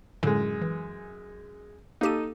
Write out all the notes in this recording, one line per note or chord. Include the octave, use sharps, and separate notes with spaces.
F#2 A2 D3 G#3
E3
A#3 D#4 G4 A4 D#7